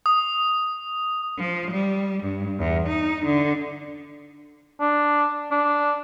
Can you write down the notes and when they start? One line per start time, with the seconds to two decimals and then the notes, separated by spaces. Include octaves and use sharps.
0.06 D#6
1.38 F3
1.71 G3
2.23 G2
2.59 E2
2.88 D#4
3.25 D3
4.81 D4
5.51 D4